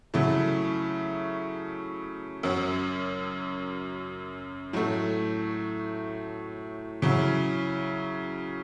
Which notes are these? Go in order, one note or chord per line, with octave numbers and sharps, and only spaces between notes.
C#3 F#3 A3 E4
F#2 F#3 C#4
A2 F#3 A3
C#3 F#3 C#4 E4